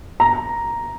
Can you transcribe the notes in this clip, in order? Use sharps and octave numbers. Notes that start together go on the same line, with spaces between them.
A#5